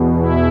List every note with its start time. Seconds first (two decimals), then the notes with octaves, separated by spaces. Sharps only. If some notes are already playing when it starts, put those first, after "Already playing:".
Already playing: E2 B2
0.15 E4